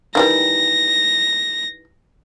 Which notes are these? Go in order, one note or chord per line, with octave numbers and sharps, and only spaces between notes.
D#3 E3 G3 A#6